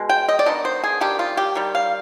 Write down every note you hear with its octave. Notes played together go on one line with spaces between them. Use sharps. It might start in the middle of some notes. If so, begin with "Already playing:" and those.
Already playing: B2 G#3
G5
D#5
D5
D#3 B3 D4 D#5
C5
G#4
D#3 G3 D4 G4
F4
G4
D#3 G3
F5